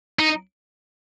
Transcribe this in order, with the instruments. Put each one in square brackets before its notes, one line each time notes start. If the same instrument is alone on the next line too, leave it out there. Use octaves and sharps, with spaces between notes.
[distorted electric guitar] D#4